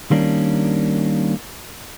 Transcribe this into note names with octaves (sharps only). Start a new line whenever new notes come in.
D#3 G3 A#3 C#4 D4